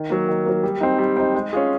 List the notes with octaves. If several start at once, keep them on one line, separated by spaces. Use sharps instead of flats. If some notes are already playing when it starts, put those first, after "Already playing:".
Already playing: D#3
F#3 A#3
D#3
F#3 A#3
G3
C4 D#4
G3
C4 D#4
G#3
C#4 F4 G#4